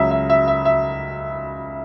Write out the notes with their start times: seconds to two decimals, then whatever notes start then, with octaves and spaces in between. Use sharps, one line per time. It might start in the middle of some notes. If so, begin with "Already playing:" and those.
Already playing: C#2 C#3 F#3 E5
0.11 E5
0.30 E5
0.48 E5
0.65 E5